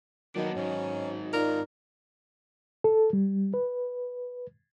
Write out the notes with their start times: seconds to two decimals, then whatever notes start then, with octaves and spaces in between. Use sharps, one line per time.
0.36 D#3 F#3 A#3 B3 D4 D#5
0.56 G#2 D#3 C#4
1.33 D#4 F4 A#4 D5
2.84 A4
3.13 G3
3.54 B4